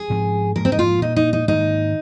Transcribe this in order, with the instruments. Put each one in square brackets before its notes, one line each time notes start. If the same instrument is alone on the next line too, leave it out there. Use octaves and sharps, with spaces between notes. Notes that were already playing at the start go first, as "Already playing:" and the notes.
Already playing: [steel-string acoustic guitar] G#4
[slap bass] G#2 F3 C4
[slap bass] G#2 F3 A#3 [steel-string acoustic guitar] A#4
[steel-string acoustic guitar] C4
D#4
F4
[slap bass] A#2 A#3 [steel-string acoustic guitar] D#4
[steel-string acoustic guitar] D#4
D#4
[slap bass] G#2 D#3 A#3 [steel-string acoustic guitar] D#4